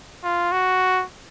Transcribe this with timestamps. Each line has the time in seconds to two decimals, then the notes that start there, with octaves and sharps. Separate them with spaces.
0.24 F4
0.52 F#4